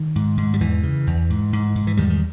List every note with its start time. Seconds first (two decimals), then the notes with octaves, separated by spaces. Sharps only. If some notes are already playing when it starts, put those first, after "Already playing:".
Already playing: D#3
0.15 G#2
0.37 G#2
0.54 G3
0.60 E2 E3
0.83 C#3
1.07 E2
1.30 G#2
1.53 G#2
1.75 G#2
1.87 E3
1.97 E2 D#3 G3
2.09 D#3